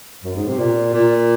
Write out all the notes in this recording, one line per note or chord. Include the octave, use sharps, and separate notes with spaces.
F#2
G#2
C3
A#2
A#2